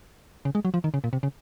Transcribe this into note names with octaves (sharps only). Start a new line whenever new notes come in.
C#3
G#3
F#3
F3
D#3
C#3
A#2
C3
C#3